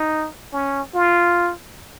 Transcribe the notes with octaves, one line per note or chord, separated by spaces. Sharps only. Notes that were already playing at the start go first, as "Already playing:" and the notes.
Already playing: D#4
C#4
F4